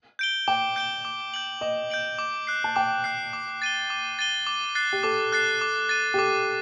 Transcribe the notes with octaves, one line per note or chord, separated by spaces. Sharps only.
G6 D7 G7
G5 D6
G6 D7 G7
D6
G6 D7 F#7
D#5 D6
G6 D7 F#7
D6
F#6 C7
A5
G5 D6
F#6 C7
D6
A6 D#7 G7
D6
A6 D#7 G7
D6
F#6 A6 C7
G4
A4 D6
F#6 A6 C7
D6
A6 D#7
G4
A4 D6